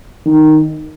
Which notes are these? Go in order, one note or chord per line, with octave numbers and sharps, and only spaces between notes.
D#3